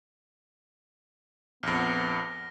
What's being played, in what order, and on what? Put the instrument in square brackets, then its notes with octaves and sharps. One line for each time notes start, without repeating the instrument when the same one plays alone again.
[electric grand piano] A#1 F2 [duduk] B3 [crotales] F6 A#6